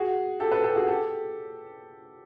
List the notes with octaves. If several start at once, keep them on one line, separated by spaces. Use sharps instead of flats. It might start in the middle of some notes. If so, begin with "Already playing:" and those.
Already playing: F#4 G#4
G4 A4
A4 B4
G4 A4
F#4 G#4
G4 A4